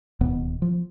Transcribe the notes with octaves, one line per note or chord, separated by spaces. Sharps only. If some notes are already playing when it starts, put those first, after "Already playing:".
D1 D#2 B2 B3
F3